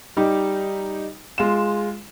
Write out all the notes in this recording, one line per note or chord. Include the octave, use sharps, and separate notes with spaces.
G3 D#4 G4
G#3 F4 E7